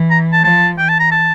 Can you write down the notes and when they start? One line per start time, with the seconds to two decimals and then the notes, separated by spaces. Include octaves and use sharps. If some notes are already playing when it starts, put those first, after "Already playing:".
Already playing: E3
0.10 A#5
0.33 A5
0.44 F3 A5
0.78 E3 G5
0.89 A5
1.00 A#5
1.11 A5